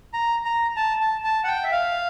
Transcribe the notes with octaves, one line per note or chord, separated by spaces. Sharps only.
A#5
A#5
A5
A5
A5
F#5
G5
E5
F5